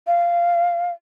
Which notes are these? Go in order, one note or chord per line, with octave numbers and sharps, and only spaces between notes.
F5